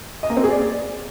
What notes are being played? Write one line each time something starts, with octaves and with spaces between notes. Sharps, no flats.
D#5
A#3
C4
G#4
D5